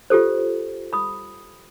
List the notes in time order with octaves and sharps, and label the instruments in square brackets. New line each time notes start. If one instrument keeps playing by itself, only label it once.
[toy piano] F4 G4 A4 C5
B5 D#6